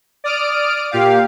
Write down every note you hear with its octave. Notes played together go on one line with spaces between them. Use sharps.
D5 D#6 F6 D7
A#2 G4 F5